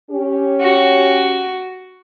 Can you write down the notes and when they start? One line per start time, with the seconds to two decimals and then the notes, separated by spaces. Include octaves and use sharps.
0.11 C#4 G4
0.61 F#4